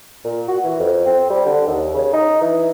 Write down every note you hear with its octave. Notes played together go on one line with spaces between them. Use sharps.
A#2
F#4
E3
F2
C4
G3
D3
D#2
C#3
D#4
E3